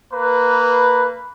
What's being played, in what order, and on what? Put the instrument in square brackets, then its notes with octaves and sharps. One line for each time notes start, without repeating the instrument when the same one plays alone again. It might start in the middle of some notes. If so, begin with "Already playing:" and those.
[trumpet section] A#3 B4